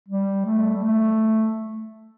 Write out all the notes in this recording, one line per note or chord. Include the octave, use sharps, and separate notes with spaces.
G3
A3
G3
A3